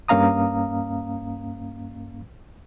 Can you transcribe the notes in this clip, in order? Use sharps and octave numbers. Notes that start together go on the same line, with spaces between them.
G2 A#3 C#4 F5 A#5 D#6